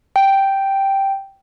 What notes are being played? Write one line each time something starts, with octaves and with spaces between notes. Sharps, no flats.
G5